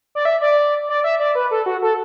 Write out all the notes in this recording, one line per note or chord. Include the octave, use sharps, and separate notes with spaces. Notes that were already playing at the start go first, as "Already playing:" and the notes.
D5
E5
D5
D5
E5
D5
B4
A4
F#4
A4